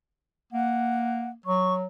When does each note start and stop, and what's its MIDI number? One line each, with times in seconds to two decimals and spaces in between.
0.53 1.34 58
0.53 1.30 78
1.46 1.86 54
1.46 1.74 85